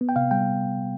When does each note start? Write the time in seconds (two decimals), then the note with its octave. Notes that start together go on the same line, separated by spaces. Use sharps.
0.01 B3
0.09 G5
0.16 C3 F5
0.31 G3 G5